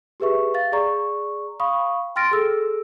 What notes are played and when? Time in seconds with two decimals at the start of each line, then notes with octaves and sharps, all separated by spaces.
0.20 G4 G#4 B4 E5 C#6
0.54 F5 A6
0.72 G#4 D5 A#5 C#6
1.60 F5 B5 C#6 D#6
2.16 G5 C6 F6 A6 A#6 D7
2.31 G#4 A4 E6